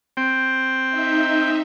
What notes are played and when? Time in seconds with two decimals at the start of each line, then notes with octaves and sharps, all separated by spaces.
0.17 C4 G5
0.90 D#4 E5